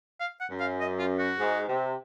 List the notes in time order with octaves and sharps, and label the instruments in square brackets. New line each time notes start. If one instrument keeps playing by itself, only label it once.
[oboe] F5
F#5
[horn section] F#2
[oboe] F5
D#5
F4
F#4
[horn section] G#2
C3